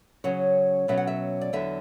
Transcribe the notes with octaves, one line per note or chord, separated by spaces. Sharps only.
C#3 F#3 C#4 C#5
B2 F#3 C#4 E5
F#5
E5
D5
E2 D3 F#3 E5